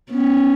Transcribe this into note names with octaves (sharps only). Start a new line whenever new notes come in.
B3 C#4